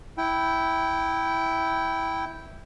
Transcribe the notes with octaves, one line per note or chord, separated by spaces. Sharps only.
E4 G5